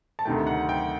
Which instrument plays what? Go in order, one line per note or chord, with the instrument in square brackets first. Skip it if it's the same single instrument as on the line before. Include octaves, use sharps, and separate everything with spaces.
[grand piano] A5
D2 C3 D#3 A3 G5
F#5
G5